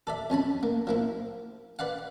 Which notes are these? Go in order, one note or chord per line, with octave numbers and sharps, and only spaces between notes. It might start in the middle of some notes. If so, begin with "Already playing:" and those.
A4 D5 E5
F2 C#4 A5 B5
A#3
F3 A#3 E4
B4 D5 F5 F#5